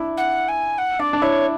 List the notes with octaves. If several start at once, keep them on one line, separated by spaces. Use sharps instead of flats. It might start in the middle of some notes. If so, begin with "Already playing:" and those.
Already playing: D4 E4
F#5
G#5
F#5
D4 D5
D4
E4 C#5